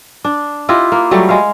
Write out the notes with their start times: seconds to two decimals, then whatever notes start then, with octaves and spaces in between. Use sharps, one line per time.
0.24 D4
0.69 E4 F4 G4 D#5
0.92 A#3
1.11 F#3 G3 A3
1.29 G#3 F5